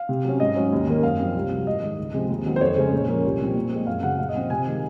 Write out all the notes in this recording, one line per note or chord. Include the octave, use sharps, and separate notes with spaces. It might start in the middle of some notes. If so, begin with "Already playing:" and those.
Already playing: F5
C3
F#3 C#4
G#2 D#5
F#3 C#4
D#2
D#3 A#3 C#4
F#2 F5
F3 C4
C2
C3 F#3
G#2 D#5
D#3 G#3
C#2
C3 F3 G#3 C4
D#2
D#3 F#3 C4
C5
F2 C#5
C#3 G#3 C#4
A#2
F3 A#3 C#4
C2
A#2 F3 C4
A#2
G#3 C4
F#2 F5
C#3 F#3 F#5
A#2 F5
D#5
F3 C4
C3 G#5
D#3 G#3